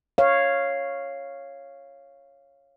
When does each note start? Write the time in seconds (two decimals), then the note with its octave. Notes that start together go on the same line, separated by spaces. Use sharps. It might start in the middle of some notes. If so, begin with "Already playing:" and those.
0.18 C#5 F5